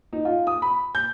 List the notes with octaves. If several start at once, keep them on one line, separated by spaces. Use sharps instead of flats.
D#4
F4
D#6
B5
G6